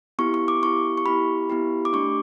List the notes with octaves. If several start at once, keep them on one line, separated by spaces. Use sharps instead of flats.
B3 E4 G4 C#6
C#6
D6
B3 E4 G4 C#6
C#6
B3 E4 G4 B5
B3 E4 G4
D6
A3 D4 G4 C#6